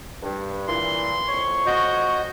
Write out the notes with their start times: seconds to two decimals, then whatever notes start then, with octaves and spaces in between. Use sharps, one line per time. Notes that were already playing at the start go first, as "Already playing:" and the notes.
0.22 G2
0.68 A#2 E3 C6
1.28 F2 C#5 C#6
1.67 F#4 D#5 G6